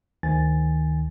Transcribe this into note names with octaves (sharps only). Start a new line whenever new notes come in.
D2 D#3 G#5 A6